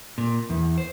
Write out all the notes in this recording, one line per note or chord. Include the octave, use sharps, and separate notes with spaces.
A#2
E2
C5